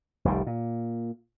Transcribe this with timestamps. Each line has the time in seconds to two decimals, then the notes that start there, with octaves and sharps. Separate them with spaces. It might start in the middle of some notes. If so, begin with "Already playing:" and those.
0.25 F1 C2 D#3 G3
0.47 A#2